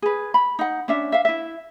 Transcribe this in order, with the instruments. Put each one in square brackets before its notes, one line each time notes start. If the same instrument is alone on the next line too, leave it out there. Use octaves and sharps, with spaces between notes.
[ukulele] G#4 B4
B5
D#4 F#5
C#4 D4 E5
E5 F5
E4 E5